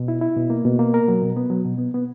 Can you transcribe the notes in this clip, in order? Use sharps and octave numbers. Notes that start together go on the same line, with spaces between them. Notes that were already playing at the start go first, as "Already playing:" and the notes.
Already playing: B2
E4
E4
B2
A#3
B2
A#3
A#4
F#3
B2
B3
F#3
B2
B3
B3